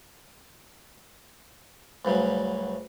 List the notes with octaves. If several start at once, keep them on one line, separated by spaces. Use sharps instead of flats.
D2 G2 C#3 F#3